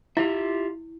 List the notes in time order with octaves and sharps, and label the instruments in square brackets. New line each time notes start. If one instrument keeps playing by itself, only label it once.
[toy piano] E4 [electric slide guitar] F4 G4 E5